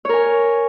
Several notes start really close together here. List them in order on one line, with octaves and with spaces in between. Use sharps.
C#5 A#4 G#5